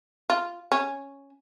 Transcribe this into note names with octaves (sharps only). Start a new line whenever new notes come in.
F4
C#4